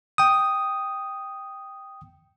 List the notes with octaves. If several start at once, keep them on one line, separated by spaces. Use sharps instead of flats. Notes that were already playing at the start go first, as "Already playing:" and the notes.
G5 D#6